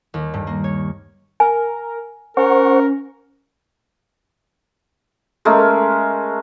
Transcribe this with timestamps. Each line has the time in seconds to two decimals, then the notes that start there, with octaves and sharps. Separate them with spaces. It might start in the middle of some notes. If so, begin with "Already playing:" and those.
0.14 D#2
0.34 G2
0.47 A#3
0.64 C#5
1.40 A#4 G#5
2.37 C#4 A#4 C5 F#5 C#6
5.45 G#3 A3 C#4 A#4